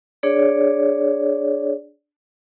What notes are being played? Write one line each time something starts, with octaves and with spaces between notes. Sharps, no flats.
D4 G#4 C#5 D5